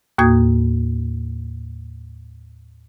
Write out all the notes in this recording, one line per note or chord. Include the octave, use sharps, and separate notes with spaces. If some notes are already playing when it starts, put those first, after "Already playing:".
D#2 A2 A#3 F#4 D#6 G#6